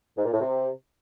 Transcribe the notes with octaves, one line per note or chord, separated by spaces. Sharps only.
G#2
A#2
A2
C3